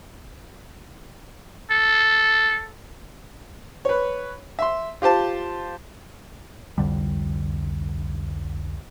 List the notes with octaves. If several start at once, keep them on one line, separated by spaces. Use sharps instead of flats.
A4
B4 C#5
E5 C6
F4 G4 C5 A5
C2 F2 D3 G3